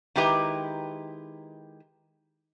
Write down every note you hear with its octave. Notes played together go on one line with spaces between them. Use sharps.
D#3 G#3 E4 G4 B4 A#5